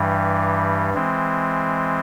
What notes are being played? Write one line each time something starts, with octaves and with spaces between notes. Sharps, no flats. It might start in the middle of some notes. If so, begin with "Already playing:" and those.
Already playing: G2 E3 G3
E3 G#3 C4